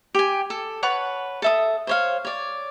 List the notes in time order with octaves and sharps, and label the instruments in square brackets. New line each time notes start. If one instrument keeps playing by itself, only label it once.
[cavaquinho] G4 G#5
A4
B4 C#5 F#5 A5
A4 E5 D#6
C5 C#5 F5
C#5 D5